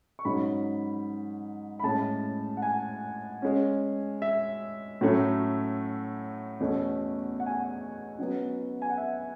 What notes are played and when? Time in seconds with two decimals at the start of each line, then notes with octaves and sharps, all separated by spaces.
0.19 C#6
0.25 G#2 F#3 C#4 B5
1.80 B5
1.84 A2 G#3 C#4 A5
2.57 F#5
2.62 G#5
3.42 C#3 G#3 C#4
4.22 E5
5.01 A2 F#3 A3 C#4
6.60 E2 B2 A3 C#4
7.40 F#5
7.46 G#5
7.54 F#5
8.18 C#3 F#3 B3
8.82 G#5
8.90 F#5
8.98 E5